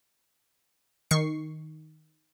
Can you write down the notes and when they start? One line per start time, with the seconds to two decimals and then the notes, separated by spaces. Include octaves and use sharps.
1.11 D#3 C#6 C7